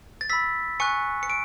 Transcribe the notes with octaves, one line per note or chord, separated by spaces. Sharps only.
A6
B5 E6 B6
G#5 C#6 F#6 C#7
C#7
D7